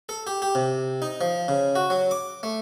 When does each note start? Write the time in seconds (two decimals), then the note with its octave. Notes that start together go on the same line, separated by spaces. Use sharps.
0.09 A4
0.27 G4
0.42 G4
0.55 C3
1.02 D#4
1.21 F3
1.48 C#3
1.76 F#4
1.90 F#3
2.11 D6
2.43 A3